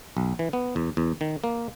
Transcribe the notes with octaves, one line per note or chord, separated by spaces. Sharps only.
B1
E3
B3
E2
E2
D#3
A#3